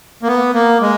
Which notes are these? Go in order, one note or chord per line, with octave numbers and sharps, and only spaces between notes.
A#3
B3
A#3
G#3